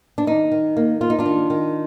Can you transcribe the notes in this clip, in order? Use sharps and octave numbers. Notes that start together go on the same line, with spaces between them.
D4
D#3 D#4
D#3
A#3
A#3 F4
D#4
D4 F4
D#3
D#3